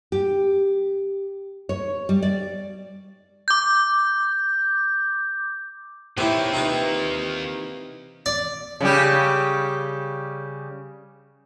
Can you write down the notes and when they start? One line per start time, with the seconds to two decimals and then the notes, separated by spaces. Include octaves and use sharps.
0.12 G4
1.69 C#5
2.09 G3
2.23 D5
3.48 D6 G6
6.18 D#3 E3 A#3 C4 E4 G4 C5 C#5
6.54 C3 C4 D#4 F4 B4
8.26 D5
8.81 C#3 G3 G4